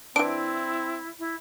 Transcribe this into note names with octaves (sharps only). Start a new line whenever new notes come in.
E3 C4 D4 E4 D7
E4